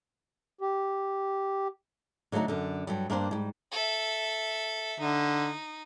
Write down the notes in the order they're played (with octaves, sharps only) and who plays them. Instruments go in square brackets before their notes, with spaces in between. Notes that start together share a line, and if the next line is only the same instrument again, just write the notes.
[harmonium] G4
[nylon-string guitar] D3 F#3 A3 B3 D#4
F#2 D3
G2 F#3 G3
G2 A#3 D4 C5
G#2 G3
[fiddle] A4 E5
[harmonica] D3 [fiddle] D#4